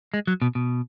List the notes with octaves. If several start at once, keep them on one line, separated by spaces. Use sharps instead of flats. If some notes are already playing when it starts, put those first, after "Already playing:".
G#3
F#3
B2
B2